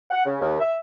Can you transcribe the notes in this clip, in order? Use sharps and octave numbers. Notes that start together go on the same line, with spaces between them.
F#5
C#3
D#2
E5